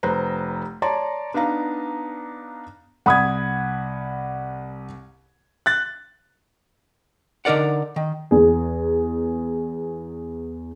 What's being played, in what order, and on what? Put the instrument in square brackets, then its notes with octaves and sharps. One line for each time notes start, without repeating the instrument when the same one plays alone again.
[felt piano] F1 B4 C5 A#5
C#5 D5 A5 A#5 C6
B3 D4 D#4 F5 A#5
[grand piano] C2 G#6 [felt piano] F#5 B5 D#6
[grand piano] F#6 A6
[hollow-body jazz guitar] D3 D#4 A#4 D5 F#5
D#3
[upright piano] E2 G#4